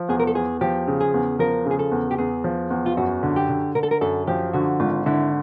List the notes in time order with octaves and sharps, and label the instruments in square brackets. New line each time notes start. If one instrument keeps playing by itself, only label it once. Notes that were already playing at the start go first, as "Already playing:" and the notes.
Already playing: [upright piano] F3
[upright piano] E2 [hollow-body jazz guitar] G#4
[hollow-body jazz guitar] A#4
A4
[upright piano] E2 [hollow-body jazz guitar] G#4
[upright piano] F3 [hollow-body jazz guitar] G4
[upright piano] C#3
[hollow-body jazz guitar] G#4
[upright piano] E2
[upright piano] F3 [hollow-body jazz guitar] A#4
[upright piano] C#3
[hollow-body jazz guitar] G#4
A4
[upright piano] E2
[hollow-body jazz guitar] G4
[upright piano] E2 [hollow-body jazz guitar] G#4
[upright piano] F3
E2
[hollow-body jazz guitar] F4
[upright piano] F#2 [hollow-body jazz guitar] F#4
[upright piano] D3
[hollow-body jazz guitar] G4
[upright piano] D3
[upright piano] D3 [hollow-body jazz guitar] A#4
[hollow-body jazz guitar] A4
A#4
[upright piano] F#2 [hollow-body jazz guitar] A4
[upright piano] F3 [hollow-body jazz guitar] G4
[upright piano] D3 [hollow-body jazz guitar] F#4
[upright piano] G#1 [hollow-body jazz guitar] F4
[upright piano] D3 [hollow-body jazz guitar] E4